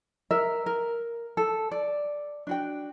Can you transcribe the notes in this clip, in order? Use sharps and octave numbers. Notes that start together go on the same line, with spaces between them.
A#4 E5
A#4
A4
D5
D4 F#4 G5